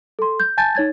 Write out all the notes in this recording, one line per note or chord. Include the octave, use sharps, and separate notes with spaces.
A4 C6
G6
G#5 A5 G6 A6
D#4 C#5 G#6 A6